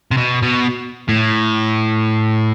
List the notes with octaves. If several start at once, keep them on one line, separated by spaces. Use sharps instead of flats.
C3
B2
B2
A2